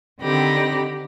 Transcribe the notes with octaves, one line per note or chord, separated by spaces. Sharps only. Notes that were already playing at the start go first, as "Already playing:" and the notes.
D3 D#3 C4 G4 B5 A#6